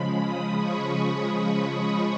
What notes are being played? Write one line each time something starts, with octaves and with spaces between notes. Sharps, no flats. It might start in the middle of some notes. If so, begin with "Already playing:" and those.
Already playing: C#3 F3 G#3 B5
D#6
C#6
B5